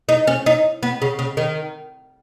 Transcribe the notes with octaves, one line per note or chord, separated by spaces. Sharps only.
D#4
C#4
D#4
B3
C#3
C#3
D#3